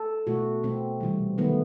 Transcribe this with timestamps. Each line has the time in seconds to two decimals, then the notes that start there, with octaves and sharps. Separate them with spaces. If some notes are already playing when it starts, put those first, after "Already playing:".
Already playing: A4
0.27 B2 A3 F#4
0.63 B2 A3 C4
1.00 C3 E3 G3
1.38 D#3 F#3 A3 B3